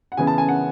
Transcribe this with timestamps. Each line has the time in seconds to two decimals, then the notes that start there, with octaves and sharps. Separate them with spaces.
0.12 F#5
0.17 C#3 E3 B3 G#5
0.27 A5
0.38 G#5
0.49 F#5